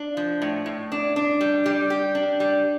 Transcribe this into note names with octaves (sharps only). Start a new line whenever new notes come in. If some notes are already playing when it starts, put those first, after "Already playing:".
Already playing: D4
F3
A2
A2
D4
D4
G3
G3
G4
D4
G3